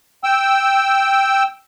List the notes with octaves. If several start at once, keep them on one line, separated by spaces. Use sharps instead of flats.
G5 E6